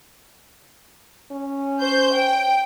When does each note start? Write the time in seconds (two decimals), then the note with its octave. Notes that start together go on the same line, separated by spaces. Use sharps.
1.32 C#4
1.81 C5 G6
2.14 G5